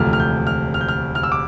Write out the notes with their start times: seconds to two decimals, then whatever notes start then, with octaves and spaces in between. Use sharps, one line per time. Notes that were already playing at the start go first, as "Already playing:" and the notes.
Already playing: E1 D2 C3 F3 A3 F6
0.13 F6
0.20 G6
0.47 F6
0.74 F6
0.81 G6
0.88 F6
1.15 F6
1.23 E6
1.32 D6